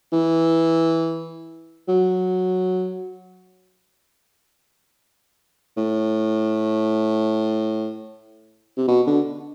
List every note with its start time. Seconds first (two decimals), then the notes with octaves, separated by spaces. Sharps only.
0.13 E3
1.88 F#3
5.77 A2
8.77 C3
8.88 B2
9.07 D3